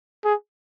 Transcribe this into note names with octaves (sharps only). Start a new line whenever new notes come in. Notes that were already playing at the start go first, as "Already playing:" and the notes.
G#4